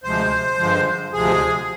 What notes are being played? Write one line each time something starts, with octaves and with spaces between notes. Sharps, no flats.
D2 C3 F3 G#3 C5
G2 D3 F3 G#3
D2 C3 F3 G#3 G#4